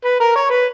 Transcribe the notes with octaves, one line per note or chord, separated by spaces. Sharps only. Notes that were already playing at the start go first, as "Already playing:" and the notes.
B4
A#4
C#5
B4